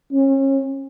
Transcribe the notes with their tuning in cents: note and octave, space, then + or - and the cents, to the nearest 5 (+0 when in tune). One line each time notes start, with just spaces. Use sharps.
C#4 -35